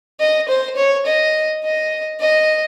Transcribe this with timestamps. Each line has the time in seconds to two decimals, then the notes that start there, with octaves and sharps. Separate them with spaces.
0.20 D#5
0.48 C5
0.76 C#5
1.06 D#5
1.63 D#5
2.20 D#5